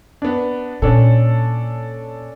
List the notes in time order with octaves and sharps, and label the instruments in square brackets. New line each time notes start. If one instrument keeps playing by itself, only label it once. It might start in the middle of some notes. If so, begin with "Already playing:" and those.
[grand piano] B3 D4
[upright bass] A#2 [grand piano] C#4 D4 A4